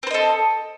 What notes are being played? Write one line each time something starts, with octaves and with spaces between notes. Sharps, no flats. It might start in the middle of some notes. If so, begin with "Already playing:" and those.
C4 A4 C5 D#5